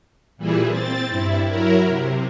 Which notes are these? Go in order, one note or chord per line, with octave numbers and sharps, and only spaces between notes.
A#2 E3 G3 E4 G#4
C4 A6
G2 E4
F#3 E4 A#4
C3